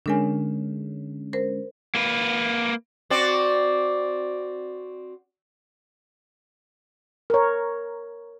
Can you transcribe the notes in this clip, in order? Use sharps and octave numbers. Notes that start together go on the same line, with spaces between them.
D3 G#3 C#4 D4 A#4 G#5
A#4 C5
A#3 B4
C4 F#4 D5
A#4 C#5